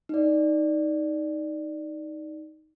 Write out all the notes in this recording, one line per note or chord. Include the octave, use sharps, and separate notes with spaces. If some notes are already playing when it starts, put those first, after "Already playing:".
D#4 D5